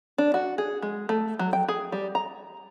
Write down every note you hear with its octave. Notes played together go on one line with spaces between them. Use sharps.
D4
F#4
G#4
G#3
A3
F#3
G5
G#4
G3
A#5